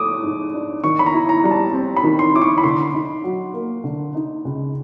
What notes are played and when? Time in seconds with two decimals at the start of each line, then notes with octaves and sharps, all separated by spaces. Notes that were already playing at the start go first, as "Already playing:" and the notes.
Already playing: A3 D6 D#6
0.23 G#2
0.54 D4
0.84 D#3 C#6
0.99 B5
1.06 A#5
1.13 E4
1.29 A#5
1.44 G3 A#5
1.51 A5
1.73 C4
1.97 B5
2.03 D#3
2.19 C6
2.34 E4 D6
2.42 C#6
2.58 B5
2.64 D3 C6
2.94 D#4
3.24 F#3
3.54 A#3
3.84 D3
4.15 D#4
4.45 C#2